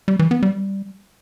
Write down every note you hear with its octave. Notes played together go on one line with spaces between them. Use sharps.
G3
E3
B3
G3